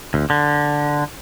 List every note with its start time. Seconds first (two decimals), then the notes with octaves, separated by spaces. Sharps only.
0.14 D2
0.30 D3